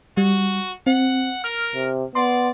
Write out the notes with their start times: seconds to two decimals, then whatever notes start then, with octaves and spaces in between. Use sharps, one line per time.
0.17 G3 F#4
0.87 C4 F#5
1.44 A#4 F6
1.75 C3
2.15 B3 D5 C6